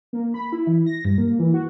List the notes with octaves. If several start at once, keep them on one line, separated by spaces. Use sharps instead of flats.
A#3
B5
E4
E3
A#6
G2
A#3
E3
F#4